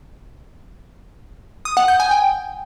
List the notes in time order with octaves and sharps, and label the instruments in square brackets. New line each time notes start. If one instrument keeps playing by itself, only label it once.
[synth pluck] D#6
F#5
G6
G#5
G5